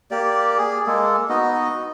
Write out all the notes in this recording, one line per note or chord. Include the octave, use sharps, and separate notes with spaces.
A#3 G4 D5
G#4
G#3 A#3 A4
B3 D#4 F#4 D#5